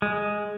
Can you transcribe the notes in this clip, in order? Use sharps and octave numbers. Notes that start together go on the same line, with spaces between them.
G#3